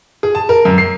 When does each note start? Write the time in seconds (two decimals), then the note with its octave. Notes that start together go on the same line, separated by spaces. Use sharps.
0.23 G#4
0.35 A5
0.49 A#4
0.65 F#2
0.78 C7